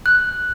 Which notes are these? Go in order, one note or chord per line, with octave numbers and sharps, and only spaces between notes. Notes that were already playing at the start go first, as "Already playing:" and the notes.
F#6